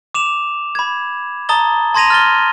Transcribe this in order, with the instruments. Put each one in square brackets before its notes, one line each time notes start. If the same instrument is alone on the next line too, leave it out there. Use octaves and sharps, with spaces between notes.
[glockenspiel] D6 E7 F7
B5 G#6
A5 A#5 D#6 A6 G7
A5 C6 G#6 A#6 D#7 F7
F6 A6 G7